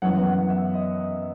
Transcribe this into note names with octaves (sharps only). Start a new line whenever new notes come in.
F#2 E3 B3 F#5
F#5
E5
D#5